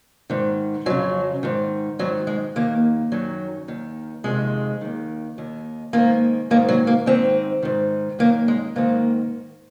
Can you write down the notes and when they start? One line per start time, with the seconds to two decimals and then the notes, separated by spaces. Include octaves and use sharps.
0.30 G#2 D#3
0.86 F2 C#3 F#3
1.43 G#2 D#3
1.99 G#2 D#3 F#3
2.27 G#3
2.56 D#2 D#3 A#3
3.12 F#2 D#3 F#3
3.68 D#2 D#3
4.24 F2 C3 D#3 G#3
4.81 D#2 D#3
5.38 D#2 D#3
5.93 G#2 D#3 A#3
6.51 D#3 A#3
6.54 G#2
6.69 F#3
6.87 A#3
7.06 G#2 D#3 C4
7.63 G#2 D#3
8.19 F#2 D#3 A#3
8.48 G#3
8.76 G#2 D#3 A#3